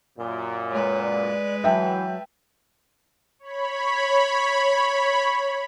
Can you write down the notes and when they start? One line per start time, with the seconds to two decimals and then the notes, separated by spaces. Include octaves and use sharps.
0.18 F#2 A#2
0.71 G#3 B4 C#5
1.02 D5
1.64 E3 F#3 E5 G5 A5
3.39 C#5 B5